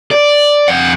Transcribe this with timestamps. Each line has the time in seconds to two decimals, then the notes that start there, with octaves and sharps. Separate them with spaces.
0.11 D5
0.68 F2 F#5